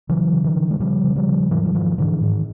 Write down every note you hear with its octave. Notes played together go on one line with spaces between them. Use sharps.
C#3 E3 F#3
C#3
D#3 F3
C#3
G#3
C#3 F3 G3
C#3
F3 G3
C#3
G#2 E3 F#3
E3
G#2 D#3 F3
G#2 D3 E3
G#2 D#3